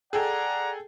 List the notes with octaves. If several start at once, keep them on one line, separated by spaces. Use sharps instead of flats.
G#4 A4 D5 F#5 G5 A#5